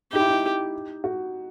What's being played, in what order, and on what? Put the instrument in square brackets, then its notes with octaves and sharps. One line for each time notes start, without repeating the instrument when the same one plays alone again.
[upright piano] D#4 [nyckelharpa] G4
[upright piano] E4
D#4
F#4